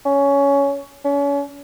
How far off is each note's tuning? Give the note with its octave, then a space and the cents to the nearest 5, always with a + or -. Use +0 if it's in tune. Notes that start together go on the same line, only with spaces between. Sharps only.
C#4 +15
C#4 +35